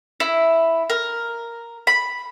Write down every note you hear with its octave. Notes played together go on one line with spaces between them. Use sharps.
E4
A#4
B5